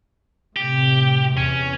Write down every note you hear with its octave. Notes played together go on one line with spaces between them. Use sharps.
A2 C3 G4
E2 C#4